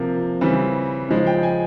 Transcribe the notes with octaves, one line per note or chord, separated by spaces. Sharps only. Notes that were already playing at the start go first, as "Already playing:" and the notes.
Already playing: C3 F3 A#3
C#3 E3 G3 C4
C#3 F3 G#3
G5
G#5